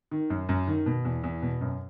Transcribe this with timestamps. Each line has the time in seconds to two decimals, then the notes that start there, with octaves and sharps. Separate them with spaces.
0.11 D#3
0.30 F#2
0.49 F#2
0.68 D#3
0.86 B2
1.05 E2
1.23 E2
1.42 B2
1.61 F#2